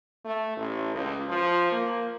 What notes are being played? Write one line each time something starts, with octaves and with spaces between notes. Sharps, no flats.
A3
A1
C#2
F3
A#3